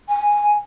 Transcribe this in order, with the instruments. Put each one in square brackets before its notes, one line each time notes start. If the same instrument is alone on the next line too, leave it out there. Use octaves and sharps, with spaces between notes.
[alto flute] G#5